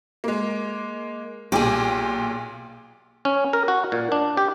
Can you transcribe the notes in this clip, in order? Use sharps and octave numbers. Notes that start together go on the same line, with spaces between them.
G#3 A#3
B1 A#2 G4 G#4
C#4
A#4
F#4
A#2
D4
G4